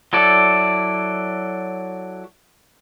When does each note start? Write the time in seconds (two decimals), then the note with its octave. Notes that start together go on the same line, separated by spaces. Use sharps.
0.13 F#3 E4 A4 D5